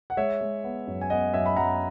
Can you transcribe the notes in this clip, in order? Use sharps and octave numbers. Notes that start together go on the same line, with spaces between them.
F#5
G#3 C#5 E5
G#3
B3
F#2
G#5
B3 D#5 F#5
F#2 E5 G#5
B5
F#2 F#5 A#5